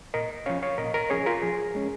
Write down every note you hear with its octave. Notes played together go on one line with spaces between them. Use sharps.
A#2 A#4 D#5
F3 C#4 C#5 F5
C#5 F5
A#2 A#4 D#5
A#4 D#5
F3 C#4 G#4 C#5
F4 A#4
F3 G#4
G#3 C#4